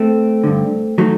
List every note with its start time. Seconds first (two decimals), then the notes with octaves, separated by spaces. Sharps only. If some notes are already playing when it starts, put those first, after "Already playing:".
Already playing: A3 C4
0.43 G2 D3
0.98 D#3 F#3 A3